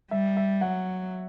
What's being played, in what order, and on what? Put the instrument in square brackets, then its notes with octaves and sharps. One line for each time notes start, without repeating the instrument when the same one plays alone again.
[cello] G3 [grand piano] E5
[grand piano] E5
[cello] F#3 [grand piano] F#5